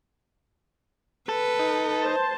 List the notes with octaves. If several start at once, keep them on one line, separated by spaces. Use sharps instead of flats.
A4 B4
D#4
C5 A5